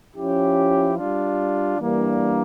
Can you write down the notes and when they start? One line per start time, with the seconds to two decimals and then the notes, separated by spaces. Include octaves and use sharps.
0.14 F3 C#4 E4 G4
0.97 G3 D4 F4
1.79 E3 G3 A#3 D4